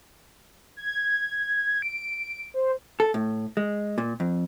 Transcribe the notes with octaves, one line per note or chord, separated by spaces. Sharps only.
G#6
D7
C5
A4
A2
G#3
A#2
F2